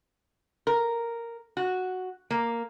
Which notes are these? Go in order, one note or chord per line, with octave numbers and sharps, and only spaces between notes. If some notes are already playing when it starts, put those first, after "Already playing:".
A#4
F#4
A#3